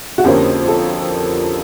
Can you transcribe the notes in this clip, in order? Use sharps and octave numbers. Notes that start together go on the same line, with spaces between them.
F#4
F2 D3 F3 A#3 C#4 G4
A4